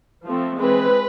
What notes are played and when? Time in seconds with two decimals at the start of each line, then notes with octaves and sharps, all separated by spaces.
0.24 F3 A3 C4
0.59 E3 G#3 C4 B4